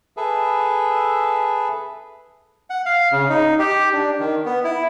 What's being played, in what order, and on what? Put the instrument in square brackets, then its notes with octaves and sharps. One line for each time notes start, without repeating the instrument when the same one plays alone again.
[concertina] G#4 A4 B4 E5
[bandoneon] F#5
F5
C#3
D#4
G4
D4
D#3
B3
E4